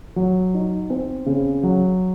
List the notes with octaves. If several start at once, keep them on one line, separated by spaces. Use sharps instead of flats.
F#3
D#4
C4
C#3
F#3